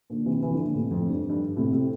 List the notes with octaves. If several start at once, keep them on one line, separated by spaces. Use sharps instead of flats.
A#2 D3
C3 E3
C3 E3
D3 F3
A#2 D3
A2 C3
F2 A2
G2
G2
A2 C3
A2 C3